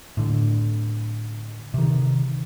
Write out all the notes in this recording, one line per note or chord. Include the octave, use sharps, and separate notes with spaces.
A2 D3
C3 D#3